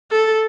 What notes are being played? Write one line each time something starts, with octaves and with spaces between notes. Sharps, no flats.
A4